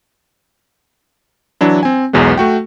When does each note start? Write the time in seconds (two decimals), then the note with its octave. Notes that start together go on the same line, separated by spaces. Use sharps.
1.61 E3 F#3 D4 E4
1.83 C4 G#5
2.13 B1 E2 F#3 G#3 B3
2.38 A3 F#4 G5